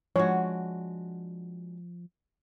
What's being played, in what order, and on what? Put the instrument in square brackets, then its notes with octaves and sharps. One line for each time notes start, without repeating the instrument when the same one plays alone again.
[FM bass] F3 [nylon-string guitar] G#3 D4 F#4 [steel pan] C#5